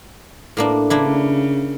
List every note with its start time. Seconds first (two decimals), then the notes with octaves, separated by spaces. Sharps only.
0.57 A2 A#3 D4
0.90 C#3 A#3 D4 E4